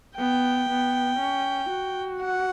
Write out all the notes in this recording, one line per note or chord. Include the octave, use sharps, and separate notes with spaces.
B3 G5
B3
C#4
F#4
F#5